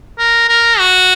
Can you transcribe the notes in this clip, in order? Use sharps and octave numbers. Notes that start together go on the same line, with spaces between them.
A#4
A#4
F#4